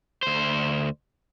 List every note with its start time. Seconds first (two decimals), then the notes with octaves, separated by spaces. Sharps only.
0.23 D2 C5